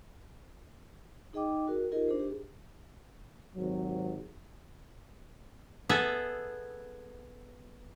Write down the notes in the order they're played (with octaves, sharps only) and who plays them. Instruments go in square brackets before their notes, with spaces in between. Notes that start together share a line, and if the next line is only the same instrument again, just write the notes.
[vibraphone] D#4 G#4 D#5 G5 D6
F#4 A#4
D#4 F4 G4 G#4 A#4 D#5
D4 G#4 C5
G4
[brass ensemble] G#1 C3 F#3
[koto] B3 G#4 A4 E5